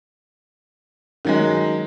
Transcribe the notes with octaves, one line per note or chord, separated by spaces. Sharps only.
D#3 F#3 G#3